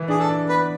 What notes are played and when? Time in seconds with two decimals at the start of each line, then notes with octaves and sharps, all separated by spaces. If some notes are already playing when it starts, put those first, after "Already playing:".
Already playing: E3
0.08 D4 G#4
0.19 A4
0.29 D4
0.48 B3 B4